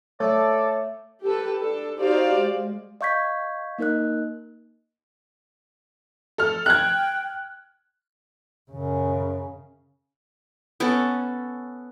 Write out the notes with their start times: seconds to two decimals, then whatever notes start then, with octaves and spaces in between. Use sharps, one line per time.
0.20 A3 A4 C#5 D5
1.23 G4 A4 B4
1.61 D4 A4
2.00 D#4 F#4 G4 C5 D5 F5
2.37 G#3
3.01 D#5 F5 C#6 G6 G#6 B6
3.78 A#3 D#4 A#4 D#5 F#6
6.38 A4 F6
6.66 G5 F#6 G#6
8.71 F#2 C#3
10.80 B3 C#4 A4